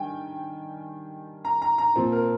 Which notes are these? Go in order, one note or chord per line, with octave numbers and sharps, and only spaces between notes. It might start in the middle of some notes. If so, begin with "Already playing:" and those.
Already playing: D#3 G3 D4 G5 G#5
A#5
A#5
A#5
A#2 F3 C4
A#4